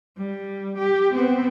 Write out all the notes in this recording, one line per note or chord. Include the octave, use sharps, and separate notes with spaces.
G3
G4
B3 C4